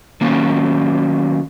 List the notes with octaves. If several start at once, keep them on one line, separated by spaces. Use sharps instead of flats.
D#3 F#3 A#3 C#4